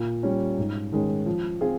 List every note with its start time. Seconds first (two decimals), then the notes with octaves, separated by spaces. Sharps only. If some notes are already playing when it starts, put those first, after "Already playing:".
Already playing: A#2
0.23 G3 C#4
0.58 G#2
0.92 D#3 G#3 C#4
1.26 F3
1.61 C4 F4 G#4